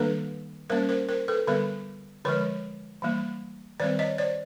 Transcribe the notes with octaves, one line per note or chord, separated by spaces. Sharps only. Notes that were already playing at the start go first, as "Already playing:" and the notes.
Already playing: D#3 G3 A#3 D4 A4 B4
G3 A#3 C#4 A#4 C5
A#4 C5
A#4 C5
A4 B4
D3 G3 B3 A4 B4
D3 F3 G#3 B4 C#5
E3 G3 A#3
D#3 G3 C4 C5 D5
C#5 D#5
C5 D5